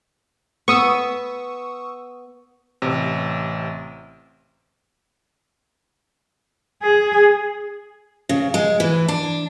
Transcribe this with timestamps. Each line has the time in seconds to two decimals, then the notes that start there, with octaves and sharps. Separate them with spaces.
0.68 B3 C#6 D#6 E6
2.82 A1 C3
6.82 G#4
8.29 C#3
8.54 G#3
8.80 E3
9.08 D4